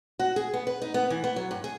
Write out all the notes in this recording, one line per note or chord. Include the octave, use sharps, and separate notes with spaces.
F#4
G#4
B3
B4
D#4
B3
E3
B3
F#3
G2
G#4